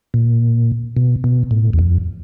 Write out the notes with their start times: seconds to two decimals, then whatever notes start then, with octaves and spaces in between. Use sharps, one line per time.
0.14 A#2
0.97 B2
1.24 B2
1.51 A2
1.73 E2
1.79 F2